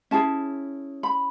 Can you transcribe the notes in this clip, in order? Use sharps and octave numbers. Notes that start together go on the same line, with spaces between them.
C#4 E4 G#4 A5
B5